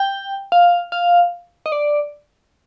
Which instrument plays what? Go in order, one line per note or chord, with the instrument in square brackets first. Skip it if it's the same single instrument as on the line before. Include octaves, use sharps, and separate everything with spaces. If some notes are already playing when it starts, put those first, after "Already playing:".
Already playing: [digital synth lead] G5
F5
F5
D#5
D5